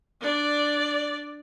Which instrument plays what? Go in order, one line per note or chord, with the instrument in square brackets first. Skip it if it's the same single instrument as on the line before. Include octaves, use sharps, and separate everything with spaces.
[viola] D4 D5